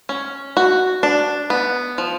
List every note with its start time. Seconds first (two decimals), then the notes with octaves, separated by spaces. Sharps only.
0.09 C#4
0.57 F#4
1.03 D4
1.50 B3
1.98 F3